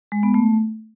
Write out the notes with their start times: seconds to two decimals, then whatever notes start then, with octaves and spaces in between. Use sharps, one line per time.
0.12 G#3
0.23 B3
0.34 A3